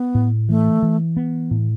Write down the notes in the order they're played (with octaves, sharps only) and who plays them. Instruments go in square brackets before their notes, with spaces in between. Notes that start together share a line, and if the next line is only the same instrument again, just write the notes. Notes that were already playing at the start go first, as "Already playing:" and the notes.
Already playing: [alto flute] B3
[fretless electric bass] A2
[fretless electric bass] E3 [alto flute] A3
[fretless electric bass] E3
B3
A2